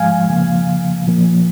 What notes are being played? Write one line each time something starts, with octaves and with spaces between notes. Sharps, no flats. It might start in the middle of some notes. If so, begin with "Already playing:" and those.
Already playing: G#2 F3 G#3 F5 G#5
F2 C#3 F3 A#3
A#2 F3 A#3